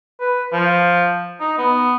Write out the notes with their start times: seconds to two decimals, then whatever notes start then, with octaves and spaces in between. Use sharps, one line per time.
0.20 B4
0.53 F3
1.40 D#4
1.58 B3